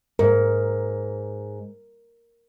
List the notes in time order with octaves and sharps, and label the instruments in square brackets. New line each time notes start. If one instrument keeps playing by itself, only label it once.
[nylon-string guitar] G#2 [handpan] A#4